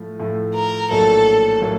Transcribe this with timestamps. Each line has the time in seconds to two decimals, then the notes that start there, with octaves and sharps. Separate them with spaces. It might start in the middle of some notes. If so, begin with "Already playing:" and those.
Already playing: A2 F3 A3
0.19 A2 F3 A3
0.55 A#4
0.90 A#1 A2 F#3 A#3 A4
1.62 A2 F#3 A#3